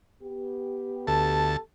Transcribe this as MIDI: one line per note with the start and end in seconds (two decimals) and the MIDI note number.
0.22 1.58 59
0.22 1.58 67
1.07 1.57 38
1.07 1.58 69
1.07 1.57 81